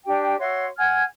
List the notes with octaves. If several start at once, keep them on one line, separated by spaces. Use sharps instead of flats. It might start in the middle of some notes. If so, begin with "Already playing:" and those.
D4 G4 G5
F#4 C#5 E5 C6
F#5 G#5 F6 G#6